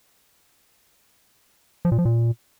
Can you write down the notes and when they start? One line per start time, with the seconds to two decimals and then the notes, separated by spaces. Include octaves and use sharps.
1.85 F3
1.92 A#2
1.98 F3
2.05 A#2